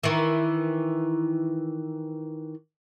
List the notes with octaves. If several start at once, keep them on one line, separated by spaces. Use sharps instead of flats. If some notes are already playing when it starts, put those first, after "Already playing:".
D#3 E3